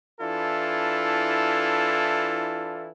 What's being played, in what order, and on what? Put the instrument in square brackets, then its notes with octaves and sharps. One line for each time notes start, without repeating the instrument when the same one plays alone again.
[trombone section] E3 D4 E4 F4 A4